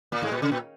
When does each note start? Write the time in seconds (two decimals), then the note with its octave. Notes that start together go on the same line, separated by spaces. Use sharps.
0.12 A#2 A#3
0.23 G#2 G#3
0.32 A#2
0.42 C#3
0.52 A#2